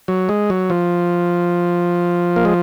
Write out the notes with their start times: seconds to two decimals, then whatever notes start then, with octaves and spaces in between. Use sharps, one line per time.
0.08 F#3
0.29 G#3
0.50 F#3
0.70 F3
2.36 A#3
2.45 G#3